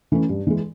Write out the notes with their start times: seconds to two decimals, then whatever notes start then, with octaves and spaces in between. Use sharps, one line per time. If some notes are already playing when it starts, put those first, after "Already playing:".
0.12 E3 A3 C#4
0.29 G2
0.47 E3 G#3